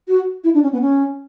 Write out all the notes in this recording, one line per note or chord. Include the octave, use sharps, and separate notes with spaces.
F#4
E4
D4
C#4
B3
C#4